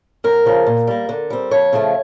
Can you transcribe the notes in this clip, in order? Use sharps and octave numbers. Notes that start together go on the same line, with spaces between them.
F#2 A#4
C#3 F3
A#2
G3 A#3
D3
G3 C4
F2 C#5
C#3 F3 A3